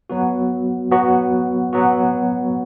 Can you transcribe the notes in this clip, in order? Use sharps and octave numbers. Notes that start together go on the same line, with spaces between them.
F#3 B3 F#4
F#3 B3 F#4
F#3 B3 F#4